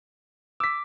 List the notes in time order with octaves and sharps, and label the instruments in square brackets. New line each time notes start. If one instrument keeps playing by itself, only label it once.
[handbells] D6 [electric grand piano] E6 B6